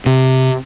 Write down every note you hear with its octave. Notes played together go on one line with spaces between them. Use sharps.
C3